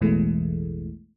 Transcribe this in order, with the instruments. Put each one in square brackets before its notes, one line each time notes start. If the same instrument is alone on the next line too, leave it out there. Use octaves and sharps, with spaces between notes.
[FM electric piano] A1 E2 B2 E3 G#3 A3